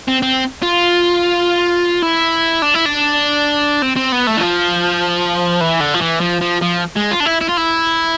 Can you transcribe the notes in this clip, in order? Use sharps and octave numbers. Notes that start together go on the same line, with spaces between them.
C4
C4
F4
E4
D4
E4
D4
C4
C4
B3
A3
E3
F3
E3
D3
F3
E3
F3
F3
F3
G#3
F4
D4
E4
E4
F4
E4